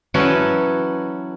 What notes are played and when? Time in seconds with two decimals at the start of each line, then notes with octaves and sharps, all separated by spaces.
0.14 E3 F#3 C#4 F#4 A4